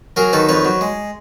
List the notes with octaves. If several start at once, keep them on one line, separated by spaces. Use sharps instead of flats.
F#3 G#4 A#4
D#3 A4 B4
F2 B4 C#5
F#3
G#3